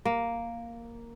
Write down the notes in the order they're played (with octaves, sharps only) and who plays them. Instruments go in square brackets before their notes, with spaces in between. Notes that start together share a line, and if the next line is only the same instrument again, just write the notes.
[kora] A#3